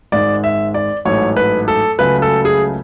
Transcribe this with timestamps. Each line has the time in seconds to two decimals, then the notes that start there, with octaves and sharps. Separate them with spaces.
0.12 G#1 G#2 G#3 D5
0.44 E5
0.74 D5
1.05 A1 G#2 F#3 A3 C#5
1.37 B4
1.68 A4
1.98 C#2 C#3 F#3 A3 B4
2.22 A4
2.45 G#4